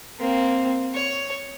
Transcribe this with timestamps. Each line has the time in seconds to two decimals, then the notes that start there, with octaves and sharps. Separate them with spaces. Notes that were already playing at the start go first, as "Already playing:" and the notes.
0.20 A#3 C4
0.94 C#5